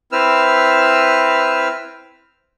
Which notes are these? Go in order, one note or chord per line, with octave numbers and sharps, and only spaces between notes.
C4 E4 B4 E6 F6